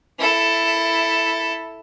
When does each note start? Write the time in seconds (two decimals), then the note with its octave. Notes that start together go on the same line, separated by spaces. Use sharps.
0.19 E4 A4